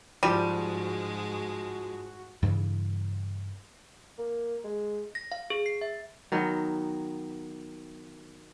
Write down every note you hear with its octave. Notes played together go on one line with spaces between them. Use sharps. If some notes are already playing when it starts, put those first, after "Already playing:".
G#2 F3 G3 G#3 F#4 D#7
G2 A#2 C#3 E3
A#3
G#3
A#6
F5
G#4
C7
E5
D#3 F#3 B3